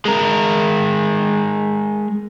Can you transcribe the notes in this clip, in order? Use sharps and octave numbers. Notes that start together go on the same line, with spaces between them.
G#3 A#4